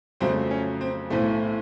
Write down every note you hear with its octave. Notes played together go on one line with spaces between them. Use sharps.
F2 C#3 F#3 A3 C4
C#4
C4
B1 A2 E3 A3 C4